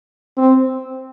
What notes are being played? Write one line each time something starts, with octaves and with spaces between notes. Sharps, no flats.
C4